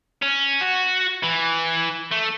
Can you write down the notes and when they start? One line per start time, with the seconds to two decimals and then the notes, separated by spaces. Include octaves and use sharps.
0.22 C#4
0.61 F#4
1.23 E3
2.11 A3